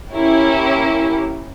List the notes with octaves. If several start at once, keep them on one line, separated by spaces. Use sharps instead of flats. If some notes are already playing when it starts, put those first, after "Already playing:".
A#3 C#4 E4 G4